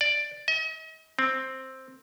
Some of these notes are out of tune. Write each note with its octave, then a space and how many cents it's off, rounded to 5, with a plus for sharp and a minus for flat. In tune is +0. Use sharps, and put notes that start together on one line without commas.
D5 +5
D#5 +40
C4 +5